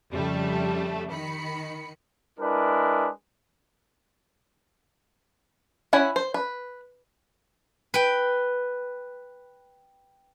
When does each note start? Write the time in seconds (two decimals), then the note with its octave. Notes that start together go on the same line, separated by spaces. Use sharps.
0.11 F2 C#3 G3 A3 A4
1.11 D#3 B5 C#7
2.39 G#3 D4 E4 A#4 B4
5.93 C#4 E4 F#5 G#5
6.16 C5
6.34 B4
7.94 B4 G5